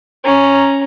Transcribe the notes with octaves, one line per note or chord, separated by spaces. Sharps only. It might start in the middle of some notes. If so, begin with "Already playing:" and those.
C#4 A#5